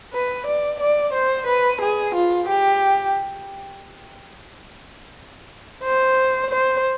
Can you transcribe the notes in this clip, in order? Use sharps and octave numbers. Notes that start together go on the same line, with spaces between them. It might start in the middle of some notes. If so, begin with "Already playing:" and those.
B4
D5
D5
C5
B4
G#4
F4
G4
C5
C5